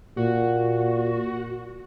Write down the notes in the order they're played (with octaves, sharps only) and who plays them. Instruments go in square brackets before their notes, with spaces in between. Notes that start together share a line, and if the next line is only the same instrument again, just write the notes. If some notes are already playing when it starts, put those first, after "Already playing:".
[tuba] A#2 [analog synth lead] F#4